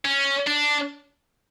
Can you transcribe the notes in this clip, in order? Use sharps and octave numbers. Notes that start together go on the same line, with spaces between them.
C#4
D4